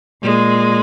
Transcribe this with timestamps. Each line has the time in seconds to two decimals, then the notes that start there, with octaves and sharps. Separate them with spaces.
0.23 A#2 G#3